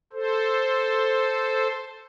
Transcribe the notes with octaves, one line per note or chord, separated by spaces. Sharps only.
A4 C5